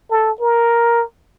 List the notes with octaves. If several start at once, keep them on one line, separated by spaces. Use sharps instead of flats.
A4
A#4